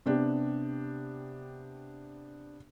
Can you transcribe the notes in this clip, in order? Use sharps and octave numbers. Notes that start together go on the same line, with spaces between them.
C3 B3 D4 G4